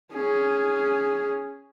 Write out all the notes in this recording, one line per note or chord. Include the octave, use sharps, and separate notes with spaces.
C#4 G#4